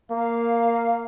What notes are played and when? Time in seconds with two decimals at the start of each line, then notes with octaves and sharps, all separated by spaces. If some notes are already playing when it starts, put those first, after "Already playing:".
0.11 A#3 F5